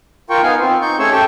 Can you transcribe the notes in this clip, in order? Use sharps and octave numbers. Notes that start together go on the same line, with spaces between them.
F4 A#4 G5 C#6
B3 D#4 F5 G#5
C4 F4
D#4 C#6 G6
A3 C#4 G#4 C#5 C#6 E6
G4 A4 G5 A5 C#6